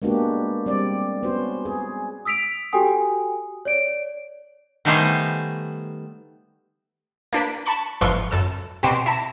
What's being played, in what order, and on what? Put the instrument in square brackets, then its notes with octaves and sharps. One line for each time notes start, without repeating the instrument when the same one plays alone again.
[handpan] G#3 A#3 B3 D4 F#4 G4
G3 C4 D5
B3 C#4 F#4 C5
G#4
[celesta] D#6 E6 B6 D7 F7
F#4 G4 A4 G5 G#5 D#6
C#5 D5 D7
[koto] D#3 G3 A3 B3 C5 G#5
[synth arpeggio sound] A#3 D4 B4
A5 B5 C#6 F#6
G1 G#2 E3 F3 C6 C#6
F#2 A4 E6 E7
B2 C4 F#4 G4
E4 A5 A#6